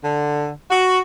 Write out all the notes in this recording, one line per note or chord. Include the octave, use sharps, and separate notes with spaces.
D3
F#4